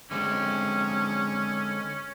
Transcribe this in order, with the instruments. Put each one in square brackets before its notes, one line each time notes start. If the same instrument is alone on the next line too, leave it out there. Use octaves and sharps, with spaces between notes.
[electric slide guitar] D3 G#3 C4 [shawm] C#4